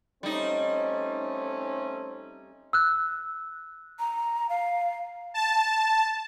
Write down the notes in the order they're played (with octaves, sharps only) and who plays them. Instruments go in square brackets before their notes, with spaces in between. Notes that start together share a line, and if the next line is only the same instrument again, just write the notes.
[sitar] G3 D#4 [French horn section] A3 C4 C#4
[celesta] E6 F#6
[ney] A#5
F5
[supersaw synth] A5